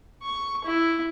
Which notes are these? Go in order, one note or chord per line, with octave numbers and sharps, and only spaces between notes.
C#6
E4